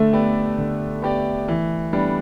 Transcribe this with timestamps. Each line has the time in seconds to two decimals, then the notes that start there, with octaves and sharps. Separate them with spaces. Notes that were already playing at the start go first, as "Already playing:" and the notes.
Already playing: D3 A3
0.13 B3 G4 D5
0.58 D3
1.02 B3 G4 D5
1.48 E3
1.93 G3 B3 D4